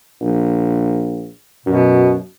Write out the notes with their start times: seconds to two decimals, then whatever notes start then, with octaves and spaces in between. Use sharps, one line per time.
0.21 A#1
1.66 F#2 B2